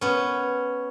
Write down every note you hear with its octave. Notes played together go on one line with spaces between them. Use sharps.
B3 C#4